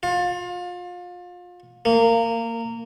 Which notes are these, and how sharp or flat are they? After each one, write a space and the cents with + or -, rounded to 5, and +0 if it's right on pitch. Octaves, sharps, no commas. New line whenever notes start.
F4 +30
A#3 -20